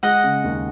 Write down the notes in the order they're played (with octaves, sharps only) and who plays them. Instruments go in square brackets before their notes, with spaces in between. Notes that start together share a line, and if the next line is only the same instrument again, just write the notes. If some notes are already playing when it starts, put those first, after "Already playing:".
[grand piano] G#3 [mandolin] D#5 F#5
[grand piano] C#3
D#2